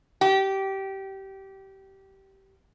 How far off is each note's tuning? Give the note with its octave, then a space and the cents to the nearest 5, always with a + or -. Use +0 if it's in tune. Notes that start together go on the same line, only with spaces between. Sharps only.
G4 -20